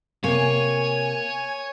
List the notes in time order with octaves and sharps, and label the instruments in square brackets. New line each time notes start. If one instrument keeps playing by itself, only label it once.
[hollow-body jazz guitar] C3 [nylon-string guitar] A#3 [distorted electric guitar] C#5 [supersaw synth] G#5